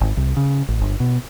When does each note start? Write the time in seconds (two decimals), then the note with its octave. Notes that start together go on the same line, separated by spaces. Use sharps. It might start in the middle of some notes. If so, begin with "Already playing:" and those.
0.01 G#1
0.17 C2
0.37 C#3
0.69 A1
0.81 G1
1.00 B2